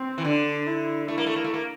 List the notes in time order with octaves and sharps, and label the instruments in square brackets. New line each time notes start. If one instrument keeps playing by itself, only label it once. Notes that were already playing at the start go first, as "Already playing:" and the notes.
Already playing: [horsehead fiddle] C4
[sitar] E3
[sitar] D3 [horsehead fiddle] D4
[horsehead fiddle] E4
[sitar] A3 [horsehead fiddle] E4
[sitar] A#3
A3
A#3
A3
A#3